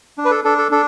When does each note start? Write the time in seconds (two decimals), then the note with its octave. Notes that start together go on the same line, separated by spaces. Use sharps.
0.18 D4
0.25 B4
0.31 A4
0.45 D4 A4
0.58 A4
0.72 D4 A4